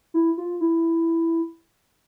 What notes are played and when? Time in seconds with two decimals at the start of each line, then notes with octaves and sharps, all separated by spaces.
0.14 E4
0.38 F4
0.60 E4